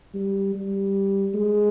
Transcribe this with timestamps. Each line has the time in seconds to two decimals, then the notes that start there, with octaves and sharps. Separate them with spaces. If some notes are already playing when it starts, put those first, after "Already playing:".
0.14 G3
0.55 G3
1.34 G#3